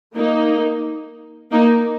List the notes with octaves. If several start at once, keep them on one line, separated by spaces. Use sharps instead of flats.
A#3 D#4
A#3 D#4